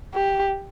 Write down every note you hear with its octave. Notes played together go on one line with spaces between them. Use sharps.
G4